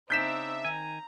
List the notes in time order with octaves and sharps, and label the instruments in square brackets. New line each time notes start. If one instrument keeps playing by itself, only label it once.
[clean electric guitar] C#3 D4 [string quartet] C4 D#4 [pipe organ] E5 [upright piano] G6 B6 E7
[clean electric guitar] D#3 G#5 [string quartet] A#5